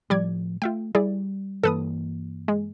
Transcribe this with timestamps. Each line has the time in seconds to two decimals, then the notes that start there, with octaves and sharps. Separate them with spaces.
0.10 A2 F3 G3 D5 G#6
0.62 A3 F4 E5 G5
0.95 G3 E4 G#4 D5
1.64 G2 E3 A#3 A4 B4 D#6
2.48 G#3